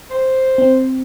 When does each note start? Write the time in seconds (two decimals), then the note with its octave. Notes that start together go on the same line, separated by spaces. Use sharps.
0.10 C5
0.58 C4